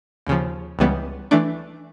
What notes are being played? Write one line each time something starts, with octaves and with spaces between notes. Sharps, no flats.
D#2 C#3 F3
C#2 C#3 E3 G3 B3
E3 A3 D4